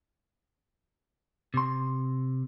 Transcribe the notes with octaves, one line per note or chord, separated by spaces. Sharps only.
C3 C6